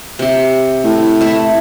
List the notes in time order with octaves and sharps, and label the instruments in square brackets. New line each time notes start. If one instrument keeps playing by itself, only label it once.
[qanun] C3 G4
[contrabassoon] A2
[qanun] A3 E4 E5